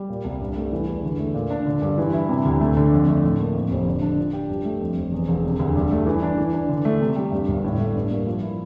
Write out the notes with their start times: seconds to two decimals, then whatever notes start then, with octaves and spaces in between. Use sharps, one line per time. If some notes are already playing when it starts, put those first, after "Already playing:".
Already playing: G3
0.10 A#2
0.24 C2
0.40 G2
0.56 A3
0.72 E3
0.87 E2
1.03 D3
1.19 A3
1.34 A#2
1.50 D4
1.66 D3
1.82 G2
1.98 E3
2.13 E4
2.29 C3
2.45 D2
2.61 A3
2.77 D3
2.92 F2
3.08 A3
3.23 A2
3.40 A#3
3.55 F2
3.70 F1
3.87 D3
4.02 D4
4.18 F3
4.33 G4
4.49 G2
4.65 A3
4.81 F2
4.97 F1
5.12 E2
5.28 E1
5.44 C3
5.59 D2
5.75 G2
5.91 A3
6.06 E3
6.22 D4
6.38 E3
6.54 D4
6.69 D3
6.85 A3
7.01 C3
7.16 G3
7.32 G2
7.48 G1
7.64 A2
7.79 A3
7.95 G2
8.11 A#3
8.26 F3
8.42 E4